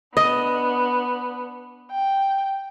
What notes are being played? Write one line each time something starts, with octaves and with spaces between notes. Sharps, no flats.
B3 D4 D#5
G5